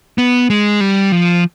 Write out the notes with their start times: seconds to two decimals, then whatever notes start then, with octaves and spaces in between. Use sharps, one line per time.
0.18 B3
0.50 G#3
0.81 G3
1.12 F3